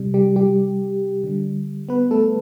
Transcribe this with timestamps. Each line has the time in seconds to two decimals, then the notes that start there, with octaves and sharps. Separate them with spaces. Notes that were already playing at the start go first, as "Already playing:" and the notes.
Already playing: C3 G3
0.14 G3 G4
0.36 G3 G4
1.24 D3 G3
1.89 B3 B4
2.11 A3 A4